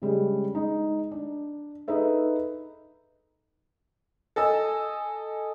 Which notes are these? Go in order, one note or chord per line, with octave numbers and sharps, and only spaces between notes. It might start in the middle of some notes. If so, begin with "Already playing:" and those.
C#3 G3 G#3 C#4
G#3 D#4
D4
D#4 G#4 A4 B4 E5
A4 D#5 G#5 E6